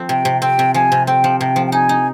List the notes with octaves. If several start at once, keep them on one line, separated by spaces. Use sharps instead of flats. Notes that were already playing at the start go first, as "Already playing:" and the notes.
Already playing: F3 C4
C3 G5
C3
C4 G5
C3
F3 G#5
C3
C4 G5
F3
C3 G5
F3
G5
D#4 G#5
D#4